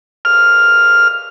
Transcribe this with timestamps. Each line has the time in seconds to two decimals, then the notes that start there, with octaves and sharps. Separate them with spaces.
0.25 F6